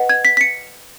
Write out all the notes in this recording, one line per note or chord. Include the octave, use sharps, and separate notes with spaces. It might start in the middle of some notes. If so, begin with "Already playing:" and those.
Already playing: B4 D#5 F#5
G#6
B6
B6
C#7